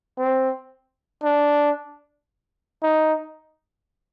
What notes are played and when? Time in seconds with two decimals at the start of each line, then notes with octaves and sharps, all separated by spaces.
0.19 C4
1.23 D4
2.83 D#4